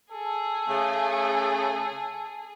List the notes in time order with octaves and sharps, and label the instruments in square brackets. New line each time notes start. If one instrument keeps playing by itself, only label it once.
[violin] G#4 [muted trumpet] A4
[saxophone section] C#3 A3